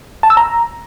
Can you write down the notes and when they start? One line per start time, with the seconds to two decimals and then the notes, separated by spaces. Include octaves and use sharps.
0.23 A5
0.30 E6
0.37 A#5